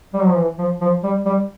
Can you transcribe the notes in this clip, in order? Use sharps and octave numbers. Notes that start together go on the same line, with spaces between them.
G3
F#3
F3
E3
F3
F3
G3
G3